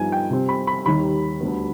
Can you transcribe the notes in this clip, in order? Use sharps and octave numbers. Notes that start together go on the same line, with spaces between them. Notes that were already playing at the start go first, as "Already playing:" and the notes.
Already playing: G2 F3 B3 D#4 G#5
G5
C3 G3 C4
B5
B5
D#2 D#3 G3 B5
D2 D3 G3 B3